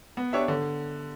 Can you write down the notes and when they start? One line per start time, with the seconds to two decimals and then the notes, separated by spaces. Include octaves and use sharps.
0.17 B3
0.33 D4 G4 C#5 E5
0.48 D3